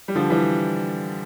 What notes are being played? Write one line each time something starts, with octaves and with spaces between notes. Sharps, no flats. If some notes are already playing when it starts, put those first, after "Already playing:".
G3
D3 F3
E3 G3